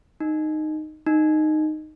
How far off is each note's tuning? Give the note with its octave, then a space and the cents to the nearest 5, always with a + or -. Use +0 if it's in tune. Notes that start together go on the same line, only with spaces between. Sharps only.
D#4 -10
D#4 -10